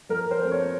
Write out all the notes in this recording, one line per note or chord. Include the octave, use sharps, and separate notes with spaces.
F3 A#4
C5
A3 C4
C#5